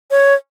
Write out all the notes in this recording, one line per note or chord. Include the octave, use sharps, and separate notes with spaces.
C#5